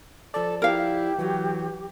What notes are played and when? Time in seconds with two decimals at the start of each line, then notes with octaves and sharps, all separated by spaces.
0.34 F3 A4 D5 A5
0.62 E4 G4 A#4 F5
1.19 E3 F#3